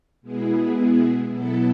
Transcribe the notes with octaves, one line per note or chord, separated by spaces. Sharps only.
B2 G#3 B3 E4 G#4
B2 F#3 B3 E4 A4